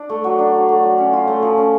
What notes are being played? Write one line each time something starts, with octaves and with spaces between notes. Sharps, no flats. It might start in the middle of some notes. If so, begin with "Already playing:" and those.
Already playing: D4
A3
F#3
D4
F#3
A3
F#3
C#4
F4
A3
F3
C#4